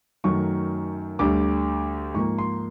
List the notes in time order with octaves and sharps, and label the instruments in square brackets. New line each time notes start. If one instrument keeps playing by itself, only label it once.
[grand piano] F#2 D#3 F#3 A3 C#6
D2 D3 G3 D6
G#2 F3 A#3 C#6
C6